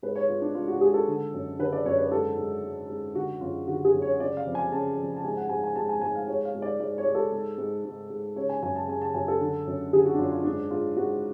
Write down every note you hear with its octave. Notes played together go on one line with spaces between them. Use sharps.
G#2 B4
C#5
G#2 F4
D4
G#2 F4
F#4
G#2 G#4
A4
D3
F#2
D3 B4
D5
F#2 C#5
B4
G#2 A4
G#2
G#2
G#2
D3 F#4
F#2 F4
D3 F#4
G#4
F#2
C#5
C#3 D5
F5
F2
G#5
C#3 A5
F2
A5
G#2 G#5
F#5
G#2 G#5
G#5
G#2 A5
G#5
G#2 G#5
F5
G#2 C#5
F5
G#2
D5
G#2 D5
C#5
G#2
A4
G#2
G#2
G#2
G#2
C#3 C#5
G#5
F#2 G#5
A5
C#3 G#5
A5
F#2 G#5
A4
D3
F#2
D3 G#4
F#4
D4
F#2 F4
F4
G#2 D4
G#2 F4
G#2 F#4